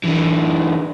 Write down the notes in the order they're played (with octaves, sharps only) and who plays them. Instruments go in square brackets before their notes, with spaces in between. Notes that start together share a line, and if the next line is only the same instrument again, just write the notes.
[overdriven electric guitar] D3 E3